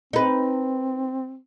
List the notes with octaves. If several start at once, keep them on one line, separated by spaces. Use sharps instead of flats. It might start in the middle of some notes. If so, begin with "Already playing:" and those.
C4 D#4 B4